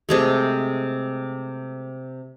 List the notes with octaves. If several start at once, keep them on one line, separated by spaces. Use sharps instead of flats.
C3 G#3 A3